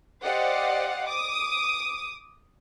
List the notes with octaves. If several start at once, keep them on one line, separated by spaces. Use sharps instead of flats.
G4 C5 D5 D#5 F5 F#5
D6 D#6